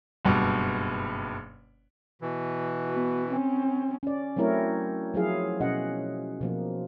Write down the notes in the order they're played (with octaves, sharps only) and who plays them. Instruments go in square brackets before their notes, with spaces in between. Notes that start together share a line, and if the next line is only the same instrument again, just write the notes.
[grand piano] F#1 G2 B2
[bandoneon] B2 E3
[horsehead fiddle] B3 F#4
C4 C#4
[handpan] C#4 D5
F#3 A3 C4 E4 A#4 C#5
F3 F#3 E4 F4 G#4 F5
B2 C#4 D#5 F#5
B2 F3 A#3